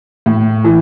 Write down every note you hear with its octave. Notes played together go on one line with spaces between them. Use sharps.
A2
E3